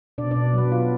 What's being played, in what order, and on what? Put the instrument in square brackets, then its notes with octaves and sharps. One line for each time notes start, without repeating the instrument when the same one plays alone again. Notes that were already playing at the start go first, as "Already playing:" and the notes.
[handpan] B2 D4 D5
D4 D5
B2
F#3 B3 B4
B3 F4